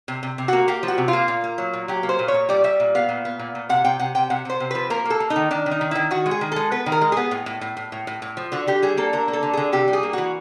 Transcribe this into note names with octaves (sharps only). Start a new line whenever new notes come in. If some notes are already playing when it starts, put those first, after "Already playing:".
C3
C3
C3
A#3 F#4
A#3 G4
F3
F#4
C3
F4
A#3
A#2
A#3
F#3
A#2
F#3 G4
A#3
C5
A#2
C#5
A#2
G3 D5
G3 E5
A#2
B3 F5
A#2
B3
A#2
A#2
C3 F#5
C3 G5
C3 F#5
C3 G5
C3 F#5
C3 C5
C3
F3 B4
A#3 A#4
A#3 A4
A#3
D#4
D#3
D#3 D4
D#3
D#4
D#3
D#3 E4
D#3 F#4
G#3
G#4
D#3
G#3 A4
B3 B4
D#3
A#4
G#3
B3 G#4
A2
A2
A2
A2
A2
A2
A2
F3
D3 F#4
D3 G4
G3 G#4
A#3 A4
D3 A#4
A#3
A4
D3
D3 G#4
C3 G4
G3
G#4
A#3
E3 F#4